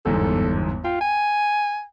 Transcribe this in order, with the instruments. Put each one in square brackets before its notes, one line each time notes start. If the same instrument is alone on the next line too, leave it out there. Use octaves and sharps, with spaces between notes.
[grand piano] G1 E2 G#2 [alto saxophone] A4
[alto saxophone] F4 [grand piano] G5
[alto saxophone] G#5